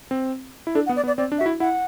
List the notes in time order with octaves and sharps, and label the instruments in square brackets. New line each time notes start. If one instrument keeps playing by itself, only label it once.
[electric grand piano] C4
E4
[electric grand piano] D4 [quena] A4
[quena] F#5
[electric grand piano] B3
[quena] D5
[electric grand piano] B3
[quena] D5
[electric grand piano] C4 [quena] D5
[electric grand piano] D4
[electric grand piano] F#4 [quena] E5
[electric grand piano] E4
[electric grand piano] E4 [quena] F#5